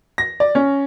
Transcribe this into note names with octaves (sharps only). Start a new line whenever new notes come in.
A#6
D5
C#4